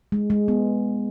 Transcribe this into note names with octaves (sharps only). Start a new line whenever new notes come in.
G#3
G#3
B3